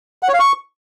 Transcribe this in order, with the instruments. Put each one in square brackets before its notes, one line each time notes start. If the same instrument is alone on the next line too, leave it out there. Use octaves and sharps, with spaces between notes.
[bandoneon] F#5
C#5
F5
C#6